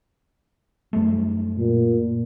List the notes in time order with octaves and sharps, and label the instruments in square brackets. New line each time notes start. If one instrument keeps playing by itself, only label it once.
[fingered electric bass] F#2 G3 A3
[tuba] A#2